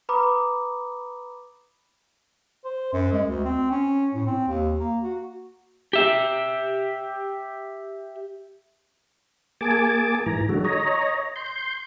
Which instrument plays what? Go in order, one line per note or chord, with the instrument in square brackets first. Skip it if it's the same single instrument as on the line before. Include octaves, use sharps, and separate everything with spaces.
[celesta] B4 A#5 B5 D6 D#6
[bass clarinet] C5
F#2
G#3
D2
C4
C#4
A2
C4
D#2
A#3
F#4
[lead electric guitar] G4 E5
[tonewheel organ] A#3 G#4 G#5 A5 D6
G#2 E3 A#5
D3 F#3 G#3 F#4 A4
C#5 D#5 A#5
C6 G6